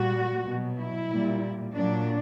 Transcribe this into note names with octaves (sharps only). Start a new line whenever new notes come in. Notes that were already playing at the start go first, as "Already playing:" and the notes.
Already playing: A#2 G3 F#4
B2 F#3
E4
A#2 G3
A#2 F#3 D4